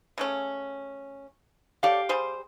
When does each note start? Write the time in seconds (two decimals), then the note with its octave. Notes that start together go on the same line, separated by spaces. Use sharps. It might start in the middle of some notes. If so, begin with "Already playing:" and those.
0.18 C#3 A3 C#4
1.83 G4 A4 C#5 D5 F5
2.09 G3 G#4 C5